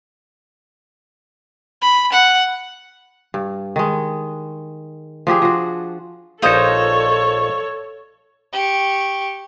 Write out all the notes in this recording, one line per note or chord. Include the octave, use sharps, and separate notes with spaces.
B5
F#5
G2
D#3 G#3
F3 D4 G4 G#4
F3 F#4
A#1 D#4 F4 A4 C5 C#5 D#5
G4 C#6